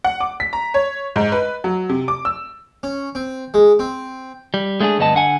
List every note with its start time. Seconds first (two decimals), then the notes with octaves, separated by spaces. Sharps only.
0.04 F#5
0.20 D6
0.40 B6
0.53 A#5
0.74 C#5
1.16 G#2
1.32 B4
1.64 F#3
1.89 C3
2.08 D6
2.25 E6
2.83 C#4
3.15 C4
3.54 G#3
3.79 C4
4.54 G3
4.80 G#3 A3 D4 G4 G#4
4.98 D2 G2 B3 D#5 A5
5.15 D3 F#5 G#5